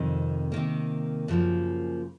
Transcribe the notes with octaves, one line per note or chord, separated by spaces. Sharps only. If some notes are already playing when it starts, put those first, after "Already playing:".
Already playing: F2 C3 D#3
C3 D#3 A#3
F#2 C#3 F3 A#3